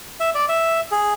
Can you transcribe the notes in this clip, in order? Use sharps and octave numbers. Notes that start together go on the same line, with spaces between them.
E5
D5
E5
G#4